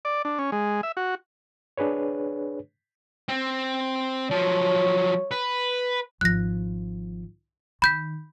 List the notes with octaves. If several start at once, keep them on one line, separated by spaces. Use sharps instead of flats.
D5
D4
C#4
G#3
E5
F#4
D4 G#4 B4 C#5
C4
F3 F#3 C#5
B4
G#1 F3 F#6 A#6
D#3 B5 G6 B6